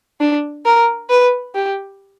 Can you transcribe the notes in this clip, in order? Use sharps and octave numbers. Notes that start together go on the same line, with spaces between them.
D4
A#4
B4
G4